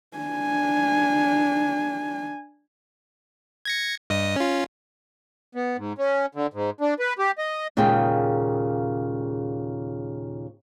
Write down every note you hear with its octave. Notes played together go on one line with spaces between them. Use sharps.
D4 G#5
G#6 A#6 C#7
G2 D#5 D#6
C#4 F4
B3
G#2
C#4
D3
G#2
D4
B4
G4
D#5
D#2 A#2 C#3 G#3 G#4 G5